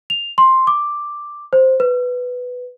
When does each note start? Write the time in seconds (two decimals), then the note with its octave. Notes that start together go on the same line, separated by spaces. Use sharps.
0.10 F7
0.38 C6
0.67 D6
1.53 C5
1.80 B4